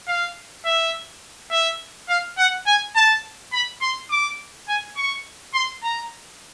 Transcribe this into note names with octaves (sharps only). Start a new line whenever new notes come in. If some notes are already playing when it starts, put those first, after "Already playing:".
F5
E5
E5
F5
F#5
G#5
A5
B5
C6
D6
G#5
C#6
C6
A#5